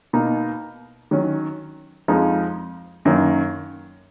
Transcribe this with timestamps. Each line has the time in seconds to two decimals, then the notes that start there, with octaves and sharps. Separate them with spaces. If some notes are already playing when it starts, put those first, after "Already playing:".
0.13 B2 A#3 D#4
1.11 D#3 F#3 C#4
2.08 F2 F3 G#3 D#4
3.05 F#2 D#3 A#3 C#4